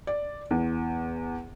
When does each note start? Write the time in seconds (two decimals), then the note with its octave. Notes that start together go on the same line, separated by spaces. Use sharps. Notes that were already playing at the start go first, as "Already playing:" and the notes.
0.07 D5
0.51 E2